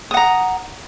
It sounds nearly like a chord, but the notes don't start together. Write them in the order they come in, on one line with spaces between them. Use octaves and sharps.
D#6 F#5 A#5